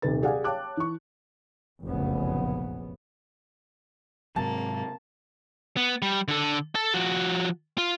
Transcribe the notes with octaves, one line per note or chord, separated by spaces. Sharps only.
D#1 C3 D#3 B4 A6
G4 G#4 D5 F5 F#5 G#5
C#5 F5 G5 A5 D6 F#6
E3 C#6
F1 A#1 F#2 C#3 B3
G#2 C3 F#3 A#3 A5
B3
G3
D3 A4
A4 A5
F3 F#4
F4